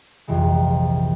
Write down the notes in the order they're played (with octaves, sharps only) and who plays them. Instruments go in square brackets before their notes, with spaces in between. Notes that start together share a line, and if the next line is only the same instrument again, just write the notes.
[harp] A#1 F2 C3 E3 G#3